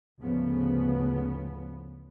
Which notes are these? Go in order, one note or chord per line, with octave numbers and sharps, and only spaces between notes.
D2 G#2 C#3 F3 B3